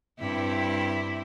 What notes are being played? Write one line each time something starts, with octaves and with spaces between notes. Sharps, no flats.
G2 C4 E4